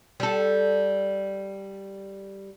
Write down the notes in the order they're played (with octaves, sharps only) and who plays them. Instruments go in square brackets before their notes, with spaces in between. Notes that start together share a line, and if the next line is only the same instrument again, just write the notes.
[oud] G3 A4